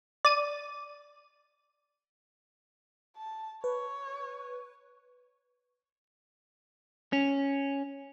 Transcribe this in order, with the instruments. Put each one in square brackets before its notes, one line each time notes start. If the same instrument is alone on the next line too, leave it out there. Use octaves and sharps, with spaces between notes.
[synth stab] D5 D#7
[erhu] A5
[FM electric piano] B4 [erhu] C#5
[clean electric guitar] C#4